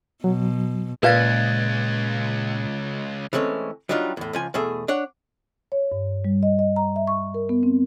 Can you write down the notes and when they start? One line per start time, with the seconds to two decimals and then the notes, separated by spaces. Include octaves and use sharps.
0.24 B2 F#3
1.03 C#2 A#2 B4 D5 F5 F#6 G#6 A6
3.33 E3 G#3 A3 C4 C#4
3.89 F#3 G3 D4 D#4 F4
4.17 E2 A2
4.33 C#2 F3 G#5
4.54 E2 B2 A3 G#4 E5
4.88 D4 C#5 F#5
5.72 C#5
5.92 G2
6.25 G3
6.43 D#5
6.59 D#5
6.76 A#5
6.96 E5
7.07 C#6
7.34 A#4
7.49 B3
7.63 C4